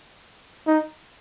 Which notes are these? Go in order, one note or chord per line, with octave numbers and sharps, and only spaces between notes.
D#4